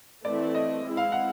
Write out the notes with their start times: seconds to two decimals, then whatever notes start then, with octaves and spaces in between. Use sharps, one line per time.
0.25 E3 A3 C4 E4 D5
0.55 D#5
0.84 G#3 C4 E4
0.97 F5
1.12 F#5